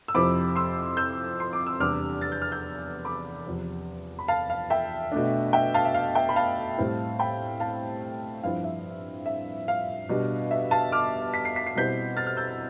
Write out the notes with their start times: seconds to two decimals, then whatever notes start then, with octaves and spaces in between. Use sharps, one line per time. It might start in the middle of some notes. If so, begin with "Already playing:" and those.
0.08 E6
0.14 F2 C3 F3 C4 E4 B5 D6
0.56 C6 E6
0.97 E6 G6
1.40 C6
1.53 D6
1.67 E6
1.80 E2 C3 G3 D4 D6 F6
2.21 A6
2.32 G6
2.42 F6
2.51 E6 G6
3.05 B5 D6
3.46 E2 C3 F3
4.19 B5
4.28 F5 A5
4.50 F5
4.70 E5 G5
5.12 B2 A3 D4
5.53 E5 G5
5.74 F5 A5
5.85 E5
5.94 F5
6.15 E5 G5
6.29 B5
6.36 F5 A5
6.77 A2 G3 C4 E4
7.19 G5 B5
7.60 F5 A5
8.43 G2 F3 C4 E4 F5
8.64 E5
9.26 E5
9.68 F5
10.09 B2 G3 D4
10.51 E5
10.71 F5 A5
10.92 D6 F6
11.34 B6
11.45 C7
11.56 B6
11.67 C7
11.75 B2 G3 C4 E4 G6 B6
12.17 F6 A6
12.27 F6
12.37 E6 G6